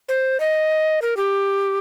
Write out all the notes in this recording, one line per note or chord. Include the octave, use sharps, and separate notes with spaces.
C5
D#5
A#4
G4